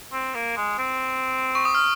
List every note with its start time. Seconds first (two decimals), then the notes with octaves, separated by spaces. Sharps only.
0.13 C4
0.34 A#3
0.56 G#3
0.78 C4
1.55 C#6
1.65 D#6
1.75 F6